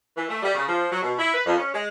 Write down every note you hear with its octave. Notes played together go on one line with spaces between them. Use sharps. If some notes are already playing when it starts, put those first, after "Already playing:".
E3
A3
G3
C#3
F3
F#3
B2
E4
B4
F2
C#4
G#3